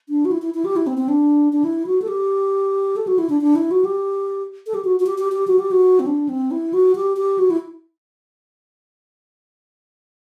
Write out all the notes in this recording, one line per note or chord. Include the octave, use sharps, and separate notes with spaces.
D4
F#4
E4
E4
E4
G4
E4
C4
C4
D4
D4
E4
F#4
A4
G4
A4
F#4
E4
D4
D4
E4
F#4
G4
A4
G4
F#4
F#4
G4
G4
G4
F#4
G4
F#4
C4
D4
C4
E4
F#4
G4
G4
F#4
E4